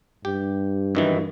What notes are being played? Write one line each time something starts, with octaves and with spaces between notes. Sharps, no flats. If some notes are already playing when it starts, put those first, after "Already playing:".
G2 G4
F#2 D#3 E3